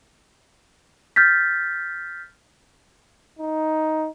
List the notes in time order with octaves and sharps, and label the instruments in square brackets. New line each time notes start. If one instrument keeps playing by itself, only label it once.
[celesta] F6 G6 A6 B6
[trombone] D#4